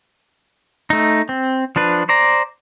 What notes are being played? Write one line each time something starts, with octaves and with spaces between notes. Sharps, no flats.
A3 D#4
C4
F3 D4 B4
C5 D5 A#5